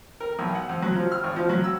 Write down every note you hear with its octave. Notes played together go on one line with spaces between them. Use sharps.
A#4
B1
F#5
F2
F#3
F3
F6
G#1
F3
F#3
E6